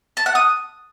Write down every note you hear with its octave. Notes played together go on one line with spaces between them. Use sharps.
A5
F#5
D#6